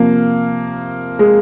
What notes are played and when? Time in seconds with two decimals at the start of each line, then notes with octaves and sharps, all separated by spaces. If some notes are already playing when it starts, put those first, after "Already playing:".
Already playing: C3 F3 A#3
1.19 G#3